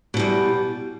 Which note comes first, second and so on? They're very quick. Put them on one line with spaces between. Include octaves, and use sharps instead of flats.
B2 E2 G3